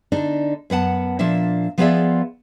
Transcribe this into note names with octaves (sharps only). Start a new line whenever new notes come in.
D3 D4 D#4
F#2 B3 F#5 A5
A#2 F3 A#3 D4 E5
F3 B3 F4 G#4 D5 E5